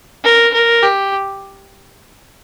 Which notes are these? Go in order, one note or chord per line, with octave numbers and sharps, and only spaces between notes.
A#4
A#4
G4